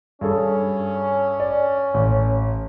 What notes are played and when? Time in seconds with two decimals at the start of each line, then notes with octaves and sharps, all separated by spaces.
0.21 G2 C#4 G#4 A4
1.40 D5
1.94 A1